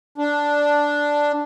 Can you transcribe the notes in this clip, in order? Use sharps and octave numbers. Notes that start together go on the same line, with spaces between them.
D4